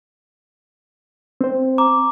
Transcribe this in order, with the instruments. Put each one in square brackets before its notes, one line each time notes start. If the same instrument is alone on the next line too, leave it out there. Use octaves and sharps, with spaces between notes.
[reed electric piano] C4 C5
[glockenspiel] A#5 D6